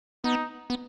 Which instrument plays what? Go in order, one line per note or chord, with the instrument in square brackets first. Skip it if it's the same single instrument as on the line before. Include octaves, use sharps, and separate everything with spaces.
[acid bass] B3 [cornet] D#4
[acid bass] B3